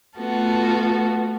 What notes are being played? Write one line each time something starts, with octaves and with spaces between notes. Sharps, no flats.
A3 B3 F4 F#4 A4